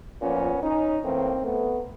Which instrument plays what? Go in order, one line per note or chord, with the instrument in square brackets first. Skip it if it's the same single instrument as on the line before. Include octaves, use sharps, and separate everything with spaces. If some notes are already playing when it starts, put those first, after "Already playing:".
[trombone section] A#2 F3 B3 C#4
C#4 D#4
A2 E3 A#3 C4
A3 B3